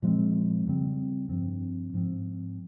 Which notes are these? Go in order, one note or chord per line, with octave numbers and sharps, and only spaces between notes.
A#2 F3 G#3 C4
F2 C#3 G3 C4
G2 F3 C4
G#2 F3 C4